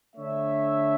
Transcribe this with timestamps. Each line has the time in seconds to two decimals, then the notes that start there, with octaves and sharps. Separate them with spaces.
0.16 D3 A3 D4 C#5 E5